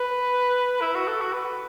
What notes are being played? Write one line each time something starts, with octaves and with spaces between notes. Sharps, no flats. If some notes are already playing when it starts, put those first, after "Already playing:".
Already playing: B4
E4
F#4
A4
F#4
B4